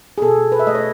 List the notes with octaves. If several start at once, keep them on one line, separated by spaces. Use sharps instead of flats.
G#4
B2 A4
B4
E5
A3 D#5
C#5